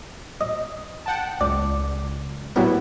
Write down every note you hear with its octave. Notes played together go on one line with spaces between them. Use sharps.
D#5
F#5 G5 A5
C#2 D5
F#3 G3 B3 E4 F#4 A#4